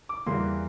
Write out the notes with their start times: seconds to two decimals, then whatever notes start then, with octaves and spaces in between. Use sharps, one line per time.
0.09 D6
0.26 E2 E3 G3 A#3 C6